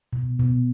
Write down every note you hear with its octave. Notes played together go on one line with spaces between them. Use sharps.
B2
B2